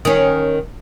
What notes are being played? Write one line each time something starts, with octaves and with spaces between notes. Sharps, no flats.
D#3 C#4